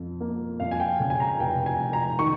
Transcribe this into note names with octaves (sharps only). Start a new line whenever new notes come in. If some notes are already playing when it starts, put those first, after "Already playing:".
Already playing: F2 F3
A#3
F2 F5
G#5
G5
C#3
G#5
A#5
F1 G5
G#5
F1
A#5
D#3 C#6